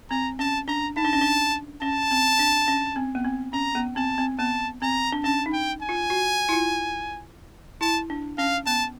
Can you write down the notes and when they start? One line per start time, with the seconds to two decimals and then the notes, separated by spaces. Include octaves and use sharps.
0.10 C4 A#5
0.39 C#4 A5
0.68 D4 A#5
0.97 D#4 A5
1.05 D4
1.13 C#4
1.21 D4
1.82 C#4 A5
2.11 C4
2.39 D4
2.68 C#4
2.96 C4
3.15 B3
3.25 C4
3.53 C#4 A#5
3.75 B3
3.96 C4 A5
4.18 C4
4.39 B3 A5
4.82 C4 A#5
5.12 D4
5.24 C#4 A5
5.46 D#4
5.53 G5
5.82 G#5
5.89 F4
6.10 F#4
6.49 E4
6.53 F4
7.81 E4 A5
8.10 D4
8.38 C#4 F5
8.66 B3 A5